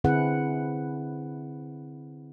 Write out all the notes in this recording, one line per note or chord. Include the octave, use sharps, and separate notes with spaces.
D3 C4 E4 G#4 B4 F#5